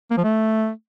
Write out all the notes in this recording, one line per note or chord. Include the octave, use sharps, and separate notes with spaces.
A#3
F3
A3